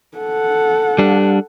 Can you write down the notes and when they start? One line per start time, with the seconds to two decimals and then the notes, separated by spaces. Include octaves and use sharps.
0.18 A4 F#5
0.98 G3 D4